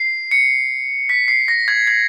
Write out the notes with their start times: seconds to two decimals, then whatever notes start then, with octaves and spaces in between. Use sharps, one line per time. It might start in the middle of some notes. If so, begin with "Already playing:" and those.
Already playing: C7
0.31 C#7
1.09 B6
1.28 C7
1.48 A#6
1.68 G#6
1.87 G#6